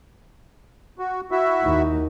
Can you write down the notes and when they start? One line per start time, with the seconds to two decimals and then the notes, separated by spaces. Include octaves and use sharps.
0.99 F#4
1.31 E4 F#4 E5
1.63 D#2 D#4